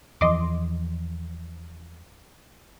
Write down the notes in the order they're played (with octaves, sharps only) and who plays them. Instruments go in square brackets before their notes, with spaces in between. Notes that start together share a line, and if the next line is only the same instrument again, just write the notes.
[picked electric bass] E2 E3 F3 [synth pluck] D#5 C6 D6